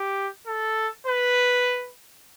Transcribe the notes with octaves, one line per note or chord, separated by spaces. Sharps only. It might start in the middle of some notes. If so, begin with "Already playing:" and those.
Already playing: G4
A4
B4